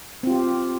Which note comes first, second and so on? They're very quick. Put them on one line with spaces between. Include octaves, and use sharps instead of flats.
C4 F4 G4